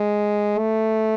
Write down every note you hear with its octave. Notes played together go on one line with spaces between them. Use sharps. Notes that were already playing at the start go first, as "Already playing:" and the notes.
Already playing: G#3
A3